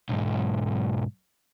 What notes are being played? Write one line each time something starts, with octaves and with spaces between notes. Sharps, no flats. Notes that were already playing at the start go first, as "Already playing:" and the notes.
B1 G#2